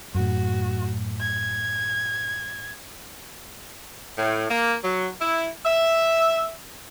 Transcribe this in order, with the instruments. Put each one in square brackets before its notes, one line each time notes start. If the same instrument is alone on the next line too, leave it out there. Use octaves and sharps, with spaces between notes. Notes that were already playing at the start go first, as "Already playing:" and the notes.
[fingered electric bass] F#2 A2 [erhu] F#4
[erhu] G#6
[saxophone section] A2
A#3
F#3
E4
E5